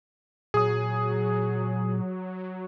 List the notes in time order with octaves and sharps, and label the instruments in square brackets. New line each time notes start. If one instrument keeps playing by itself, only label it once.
[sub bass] A#2 [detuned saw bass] F#3 [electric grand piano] G#4 D#6